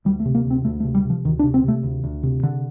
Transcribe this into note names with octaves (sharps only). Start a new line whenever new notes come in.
D2 G3
A3
C3
A#3
D2
C4
D2 A3
A3
C3
G3
C3 F3
D2 D#3
D4
C3
C4
C3 A3
D2
D2
C3
D3